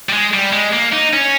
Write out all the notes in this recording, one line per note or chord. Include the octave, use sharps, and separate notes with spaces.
G3
G#3
G3
G#3
A#3
D#4
C#4